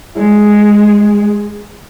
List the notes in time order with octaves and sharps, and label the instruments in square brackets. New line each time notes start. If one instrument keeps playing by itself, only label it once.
[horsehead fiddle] G#3 G#4